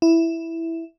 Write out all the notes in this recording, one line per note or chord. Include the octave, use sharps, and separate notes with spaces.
E4